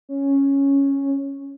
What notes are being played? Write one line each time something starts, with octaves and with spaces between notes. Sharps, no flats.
C#4